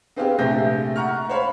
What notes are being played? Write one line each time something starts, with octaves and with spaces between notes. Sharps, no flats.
B3 C4 G4 G#4 F5
A#1 C3 A3 G6 A#6
F#5 A#5 C#6 F6
C5 C#5 F5 B5